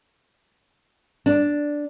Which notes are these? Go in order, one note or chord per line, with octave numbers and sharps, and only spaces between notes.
D4